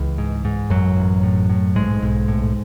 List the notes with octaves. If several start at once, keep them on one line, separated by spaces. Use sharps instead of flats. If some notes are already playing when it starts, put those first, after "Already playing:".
Already playing: C#2 E3
G#2
G#2
A1 F#2 F#3
A1
A2
A2
B1 G#2 G#3
B1
A2